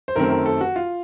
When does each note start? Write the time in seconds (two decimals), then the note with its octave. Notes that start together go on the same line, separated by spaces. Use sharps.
0.08 C5
0.16 F#2 D#3 A3 C4 A#4
0.31 A#4
0.46 A4
0.61 F#4
0.76 F4